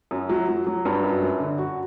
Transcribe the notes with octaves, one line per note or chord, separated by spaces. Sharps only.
F#2
F#3
F#3
F#3
G2
F#2
F#2
D3
F#4